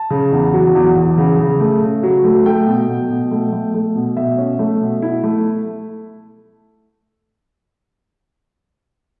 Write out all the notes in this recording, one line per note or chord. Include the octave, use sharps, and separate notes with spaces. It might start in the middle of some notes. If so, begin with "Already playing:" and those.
Already playing: A5
C#3
E2
F#3
E2
E2
C#3
C#3
A3
C#3
F#3
A3
A3 G5
B2
B2
B2
A3
A3
A3
B2
B2 E5
C#4
A3
B2
E4
A3